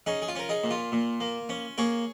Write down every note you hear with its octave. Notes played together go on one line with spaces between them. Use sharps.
C#4 D#4 G#4
G#4
F4
C#4 A#4
D#4 G#4
A#2
F4
A#2
A#3
C#4
A#3 G#4 C#5